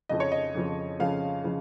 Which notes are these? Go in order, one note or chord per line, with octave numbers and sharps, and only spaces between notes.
F2 C#3 F3 D#5
C#5
D#5
F2 C#3 F3
F2 C#3 F3 F5
C#3 F3